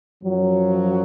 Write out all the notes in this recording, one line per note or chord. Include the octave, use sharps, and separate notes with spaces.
F#2 F3 F#3